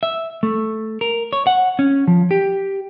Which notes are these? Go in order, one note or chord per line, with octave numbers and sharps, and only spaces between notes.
E5
A3
A#4
C#5
F#5
C#4
F3
G4